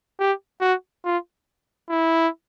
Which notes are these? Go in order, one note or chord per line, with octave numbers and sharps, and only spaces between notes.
G4
F#4
F4
E4